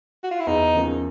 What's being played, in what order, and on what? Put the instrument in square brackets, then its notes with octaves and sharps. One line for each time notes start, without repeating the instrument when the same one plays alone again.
[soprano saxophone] F#4
F4
E4
[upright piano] E2 [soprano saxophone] D#4
[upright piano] C#3 F3 A#3 C#4